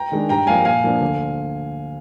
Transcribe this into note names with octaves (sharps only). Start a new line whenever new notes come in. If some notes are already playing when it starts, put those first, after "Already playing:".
Already playing: G5 A#5
D#3 G#3 D4
G2 G5 A#5
F3 A#3 D4 F5 G#5
A#2 F5 G#5
F3 A#3 D4
D2